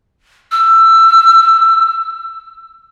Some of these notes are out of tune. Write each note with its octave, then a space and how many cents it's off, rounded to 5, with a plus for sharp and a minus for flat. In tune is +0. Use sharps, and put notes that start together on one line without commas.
E6 +20